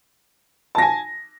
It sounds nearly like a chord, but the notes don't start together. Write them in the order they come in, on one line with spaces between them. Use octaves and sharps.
A5 A#6 G#5